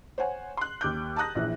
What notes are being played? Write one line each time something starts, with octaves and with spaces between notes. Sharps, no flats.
C5 C#5 F#5 G#5
C6 F#6
D#2 D6 G6
A5 A#5 D#6 F#6 A#6
A#1 E3